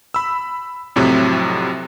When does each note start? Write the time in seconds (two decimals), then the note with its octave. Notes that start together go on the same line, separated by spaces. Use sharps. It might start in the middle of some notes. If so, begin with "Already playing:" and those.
0.14 B5 E6
0.96 F2 A2 C3 F#3